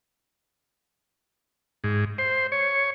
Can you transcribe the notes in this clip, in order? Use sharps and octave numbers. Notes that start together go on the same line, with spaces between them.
G#2
C5
C#5